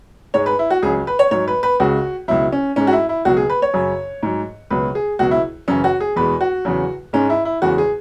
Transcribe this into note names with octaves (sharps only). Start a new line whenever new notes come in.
G#2 G#3 C#5
B4
E4
F#4
C#2 C#3 F#3 G#4
B4
C#5
G#2 F#3 C#5
B4
B4
C#2 C#3 G#3 F#4
C#2 B2 F#3 E4
C#4
G#2 G#3 C#4
F#4
E4
E4
C#2 B2 F#3 F#4
G#4
B4
C#5
F#2 C#3 F#3
G#2 F#3
C#2 B2 F#3 B4
G#4
C#2 B2 F#3 F#4
E4
F#2 C#3 E3 C#4
F#4
G#4
E2 B2 G#3 B4
F#4
E2 C#3 F#3
G#2 G#3 C#4
E4
E4
E2 C#3 G#3 F#4
G#4